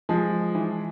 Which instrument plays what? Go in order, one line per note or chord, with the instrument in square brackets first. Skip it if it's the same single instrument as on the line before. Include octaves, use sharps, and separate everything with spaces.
[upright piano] F3 [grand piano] G#3
[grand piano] E3